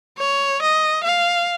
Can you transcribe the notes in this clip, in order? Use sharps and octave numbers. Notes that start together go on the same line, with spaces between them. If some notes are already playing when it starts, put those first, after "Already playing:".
C#5
D#5
F5